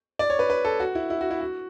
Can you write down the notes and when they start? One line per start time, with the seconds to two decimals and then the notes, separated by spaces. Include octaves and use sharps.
0.19 D5
0.30 C#5
0.39 B4
0.50 B4
0.65 A4
0.80 F#4
0.95 E4
1.10 E4
1.21 F#4
1.31 E4
1.41 F#4